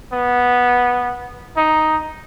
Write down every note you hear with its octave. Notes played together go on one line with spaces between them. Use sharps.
B3
D#4